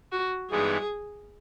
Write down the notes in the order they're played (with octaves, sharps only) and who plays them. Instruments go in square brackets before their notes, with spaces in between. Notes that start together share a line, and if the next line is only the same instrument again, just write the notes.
[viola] F#4
[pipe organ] G2 E3 G#3 B3 D#4 [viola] G#4